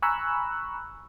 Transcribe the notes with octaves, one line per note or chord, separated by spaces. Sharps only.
G#5 A#5 B5 C#6 E6 F#6